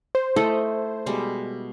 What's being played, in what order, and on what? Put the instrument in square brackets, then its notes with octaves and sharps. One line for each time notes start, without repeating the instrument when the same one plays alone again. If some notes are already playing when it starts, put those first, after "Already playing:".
[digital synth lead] C5
[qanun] A3 E4 D#5 [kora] A4
[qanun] B2 G3 G#3